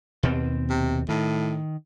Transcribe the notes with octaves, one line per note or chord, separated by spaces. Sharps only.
D#2 B2 C4
C3
A2 D#3